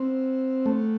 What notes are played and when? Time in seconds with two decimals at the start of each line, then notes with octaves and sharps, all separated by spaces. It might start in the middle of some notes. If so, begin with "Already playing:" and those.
Already playing: C4
0.66 A3